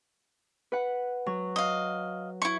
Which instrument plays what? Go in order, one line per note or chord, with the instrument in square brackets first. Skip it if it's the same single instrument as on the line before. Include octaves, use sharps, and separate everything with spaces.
[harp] B4 F#5
F#3
[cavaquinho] D#5 F5
E4 C#6